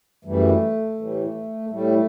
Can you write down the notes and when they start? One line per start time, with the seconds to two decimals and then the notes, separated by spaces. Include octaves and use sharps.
0.25 F#2 E3 G3 A3
0.97 A2 E3 G3
1.70 A2 G3 A3